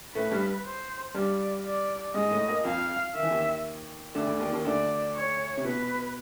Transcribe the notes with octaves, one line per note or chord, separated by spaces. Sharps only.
A2 A3 B4
G2 G3
C5
G2 G3 D5
D5
G#2 G#3 D#5
A2 A3
A#2 A#3
F2 F3 F5
D#3 E5
E3
D#2 D#3
D2 D3 D5
D2 D3
D#2 D#3
D#2 D#3
D2 D3 D5
C#5
C3
B2 B4